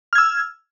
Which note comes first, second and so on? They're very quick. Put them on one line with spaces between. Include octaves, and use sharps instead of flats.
F6 G#6 E6